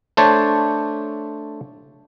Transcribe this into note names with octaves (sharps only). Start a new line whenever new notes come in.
A3 D4 C5 C#5 A5